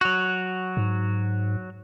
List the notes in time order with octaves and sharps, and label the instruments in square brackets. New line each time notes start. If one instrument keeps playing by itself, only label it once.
[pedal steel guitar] F#3 F#4
[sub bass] G#2